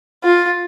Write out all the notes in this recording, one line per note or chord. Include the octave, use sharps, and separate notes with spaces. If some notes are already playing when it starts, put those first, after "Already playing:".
F4